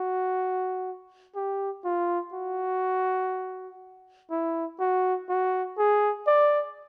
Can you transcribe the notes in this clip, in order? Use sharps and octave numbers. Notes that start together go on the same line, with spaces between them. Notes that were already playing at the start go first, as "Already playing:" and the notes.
Already playing: F#4
G4
F4
F#4
E4
F#4
F#4
G#4
D5